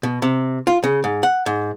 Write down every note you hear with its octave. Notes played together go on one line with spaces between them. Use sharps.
B2
C3
F4
C#3
G#2
F#5
G#2